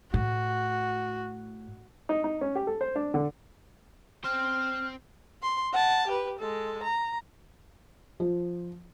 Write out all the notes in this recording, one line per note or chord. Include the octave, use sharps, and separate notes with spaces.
A2 F#4
D#4
D#4
C#4
G4
A4
C5
D4
D3
C4 C5 F6
C6
F#5 A5
G4 B4
G#3 A4
A#5
F3